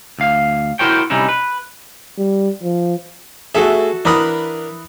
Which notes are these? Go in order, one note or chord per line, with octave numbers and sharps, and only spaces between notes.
D2 F5
E4 F#4 A#4 C5 C#5 G5
C3 G3 C#4 D#4 E4
B4
G3
F3
A3 F#4 G#4 A4 E5
E3 D4 A#4 F#5 B5 D#6